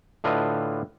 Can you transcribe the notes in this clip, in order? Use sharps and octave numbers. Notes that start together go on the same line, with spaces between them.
A2 D3 F4 B4 D#5